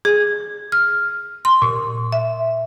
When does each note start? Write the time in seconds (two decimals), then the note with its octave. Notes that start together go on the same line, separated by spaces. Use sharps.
0.05 G#4
0.72 F6
1.45 C6
1.62 A#2
2.12 E5